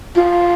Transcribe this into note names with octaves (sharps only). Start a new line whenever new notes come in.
F4